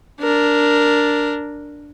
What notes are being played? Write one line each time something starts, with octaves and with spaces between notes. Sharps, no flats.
D4 A#4